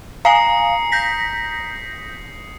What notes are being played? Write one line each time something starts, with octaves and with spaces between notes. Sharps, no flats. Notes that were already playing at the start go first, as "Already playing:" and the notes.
F5 G#5 A#5 D#6 C7 C#7
G6 A#6 B6